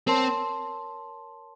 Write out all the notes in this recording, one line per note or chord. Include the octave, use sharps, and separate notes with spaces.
C4 A#4 C#5 A5 C6